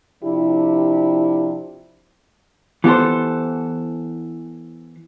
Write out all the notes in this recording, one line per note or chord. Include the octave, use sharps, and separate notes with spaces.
C3 F3 D4 E4 G4
E3 B3 G4 A4 C5